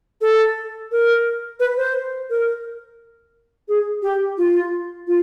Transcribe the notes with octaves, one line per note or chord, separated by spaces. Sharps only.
A4
A#4
B4
C5
A#4
G#4
G4
F4
F4